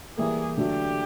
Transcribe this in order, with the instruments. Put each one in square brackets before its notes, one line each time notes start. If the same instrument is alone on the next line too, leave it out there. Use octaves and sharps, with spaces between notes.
[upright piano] E3 G3 A#3 [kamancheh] G#4
[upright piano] D3 F#3 A3 [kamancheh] G4